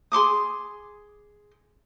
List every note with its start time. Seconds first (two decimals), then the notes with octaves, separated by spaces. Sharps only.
0.12 G#4 C6 D6 D#6